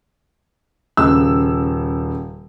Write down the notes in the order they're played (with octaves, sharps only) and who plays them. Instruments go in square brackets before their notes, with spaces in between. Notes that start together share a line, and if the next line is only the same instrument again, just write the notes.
[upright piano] D#1 C#3 E6